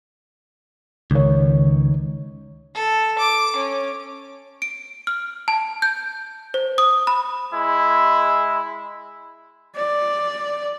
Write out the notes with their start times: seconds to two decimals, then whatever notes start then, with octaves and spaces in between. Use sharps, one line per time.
1.11 C#2 D#3 C#5
2.75 A4
3.19 D6
3.56 C#4
4.62 D7
5.07 F6
5.48 A5
5.82 G6
6.54 C5
6.78 D#6
7.07 B5
7.53 G#3 E4
9.76 D5